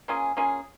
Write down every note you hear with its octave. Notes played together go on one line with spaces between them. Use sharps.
A#3 C#4 F4 G#4
A#3 C#4 F4 G#4